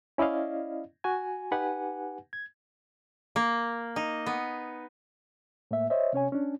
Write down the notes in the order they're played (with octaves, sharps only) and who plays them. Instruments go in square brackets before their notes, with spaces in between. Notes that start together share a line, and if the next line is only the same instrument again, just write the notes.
[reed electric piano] C#4 E4 D5 D#5 F5
F#4 G#5
D#4 G4 B4 F#5 G#5
G#6
[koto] A#3
D#4
B3
[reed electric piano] A2 A#3 E5
C5 C#5 D#5 E5
C3 C#4 C#5 G#5
C#4 D4